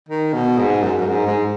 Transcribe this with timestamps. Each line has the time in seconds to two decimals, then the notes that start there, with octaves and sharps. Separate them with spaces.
0.09 D#3
0.34 B2
0.58 G#2
0.83 F#2
1.00 F#2
1.08 G#2
1.27 G#2